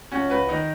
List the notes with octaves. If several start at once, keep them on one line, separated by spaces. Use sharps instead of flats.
C#2 C#4 F#4
C#2 F#4 B4
D#3 D#4